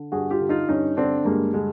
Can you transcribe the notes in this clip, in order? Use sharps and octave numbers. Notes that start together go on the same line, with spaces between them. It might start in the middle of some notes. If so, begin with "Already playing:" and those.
Already playing: D3
G2 F#4 G#4
F4 G4
D3
D#4 F4
G2 C#4 D#4
D3 C4 D4
G2 G#3 A#3
D3 G#3